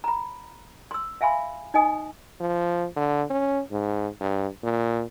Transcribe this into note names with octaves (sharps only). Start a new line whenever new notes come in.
A#5 B5
C6 E6
E5 F5 G#5 B5 C6
D#4 D#5 G#5 D#6
F3
D3
C#4
G#2
G2
A#2